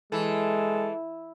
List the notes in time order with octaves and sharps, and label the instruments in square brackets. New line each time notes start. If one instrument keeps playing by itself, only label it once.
[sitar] E3 [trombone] G#3 [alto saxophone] A4